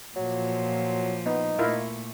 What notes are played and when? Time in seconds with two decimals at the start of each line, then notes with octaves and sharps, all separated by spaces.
0.16 A#2 F3 F#3
1.26 B3 D#4
1.59 A#2 A3 E4 F4 A#4